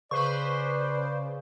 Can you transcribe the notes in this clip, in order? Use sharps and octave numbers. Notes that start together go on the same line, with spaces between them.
C#3 B4 C5 D5 C#6